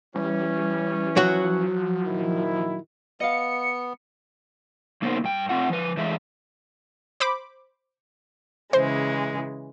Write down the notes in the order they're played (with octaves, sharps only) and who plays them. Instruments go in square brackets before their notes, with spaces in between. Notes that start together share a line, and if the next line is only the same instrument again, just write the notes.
[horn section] E3 C#4 [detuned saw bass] G3
[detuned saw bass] F3 [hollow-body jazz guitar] F#3 F#4
[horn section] A#2 D#3 E4
[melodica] B3 [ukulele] D#5 F5 [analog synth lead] C#7
[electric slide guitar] C#3 A#3 B3 D#4 A#4 C5
G2 G5
A3 C4 F4 F#5
F3 B4
E3 G#3 A3 G#4 E5
[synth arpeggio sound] C5 B5 D6
[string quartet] C#3 E3 G#3 [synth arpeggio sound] C5